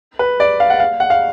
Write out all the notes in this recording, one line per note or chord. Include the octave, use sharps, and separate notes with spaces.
B4
D5
F5
F#5
F5
F#5
F5